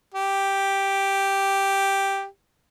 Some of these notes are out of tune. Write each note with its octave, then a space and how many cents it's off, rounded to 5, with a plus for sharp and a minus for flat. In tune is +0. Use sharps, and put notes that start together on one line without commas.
G4 +0